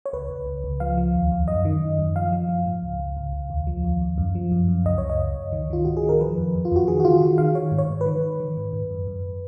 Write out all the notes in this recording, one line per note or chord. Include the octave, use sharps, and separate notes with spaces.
C#5
C#2 B4
C#2
C#2
C#2
F3 F5
F3
D#2
D#2
F#2 D#5
D#3
F#2
F#2
F3 F5
F3
F3
G#2
C#2
C#2
C#2
C#2
D#2
F3
D#2
D#2
F#2
F3
F#2
F#2
C#2 D#5
C#2 C#5
D#5
C#2
C#2
D#3
D#3 F4
G#2 F#4
G#4
D#3
A#4
F3 B4
F2
F2
F4
F2 F#4
D#3 G#4
F#4
D#3 F4
D#3 F#4
D#3 F5
D#3 C#5
G#2
C#5
G#2
B4
D#3
D#3
D#3
G#2
G#2
F#2
F#2